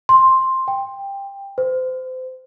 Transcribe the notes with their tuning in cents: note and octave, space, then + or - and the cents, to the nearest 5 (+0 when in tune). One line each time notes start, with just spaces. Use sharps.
C6 +10
G5 +15
C5 -30